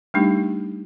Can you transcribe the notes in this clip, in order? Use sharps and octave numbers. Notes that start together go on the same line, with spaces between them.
G3 A3 D4 D#4 G4